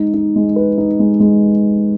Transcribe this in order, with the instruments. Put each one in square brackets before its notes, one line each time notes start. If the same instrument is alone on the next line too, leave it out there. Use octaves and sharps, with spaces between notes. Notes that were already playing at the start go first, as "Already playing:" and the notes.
Already playing: [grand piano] G#3 D#4
D#4
G#3
B4
D#4
G#3
G#3